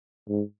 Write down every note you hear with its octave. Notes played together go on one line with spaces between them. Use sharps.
G#2